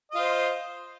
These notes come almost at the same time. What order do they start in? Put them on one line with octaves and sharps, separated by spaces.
D#5 F4 C5